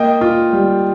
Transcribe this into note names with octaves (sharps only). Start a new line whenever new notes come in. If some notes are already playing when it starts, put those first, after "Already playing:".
Already playing: A#3 D#5 G5
F4
G3